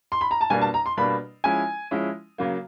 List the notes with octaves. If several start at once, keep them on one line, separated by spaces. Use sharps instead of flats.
C6
B5
A#5
A5
B2 G3 A#3 D4 G#5
A5
A#5
C6
B2 G3 A#3 D4 B5
F3 G#3 C#4 E4 G#5
F3 G#3 C#4 E4
C#3 F#3 A#3